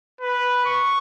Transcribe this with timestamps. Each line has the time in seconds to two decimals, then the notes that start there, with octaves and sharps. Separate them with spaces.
0.21 B4
0.66 C#6